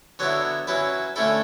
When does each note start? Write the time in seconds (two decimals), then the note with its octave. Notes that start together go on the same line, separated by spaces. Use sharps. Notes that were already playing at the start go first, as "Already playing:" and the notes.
0.19 D3 F#3 B3 E4 C#5
0.67 F#3 C#4 E4 B4
1.16 D3 A3 C#4 E4 A4